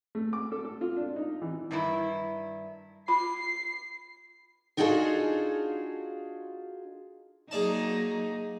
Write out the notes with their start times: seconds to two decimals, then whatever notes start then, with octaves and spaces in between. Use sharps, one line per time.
0.15 A3
0.33 D6
0.52 A4
0.65 A4
0.81 F4
0.97 D4
1.16 D#4
1.42 E3
1.71 G2 D#3 E4
3.08 F4 B5 C7
4.77 D4 D#4 F4 F#4 G#4 A4
7.51 F#3 A#3 D#4 G#4 D5 A5